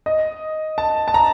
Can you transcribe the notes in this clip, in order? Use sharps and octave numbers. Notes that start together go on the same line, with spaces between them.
D#5
A5
A5
A#5